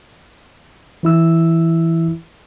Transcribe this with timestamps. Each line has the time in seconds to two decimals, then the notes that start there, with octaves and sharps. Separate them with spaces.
1.03 E3 E4 E6